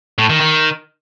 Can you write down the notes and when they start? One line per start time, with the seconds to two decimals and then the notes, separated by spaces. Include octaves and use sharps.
0.18 A2
0.29 D#3
0.41 D#3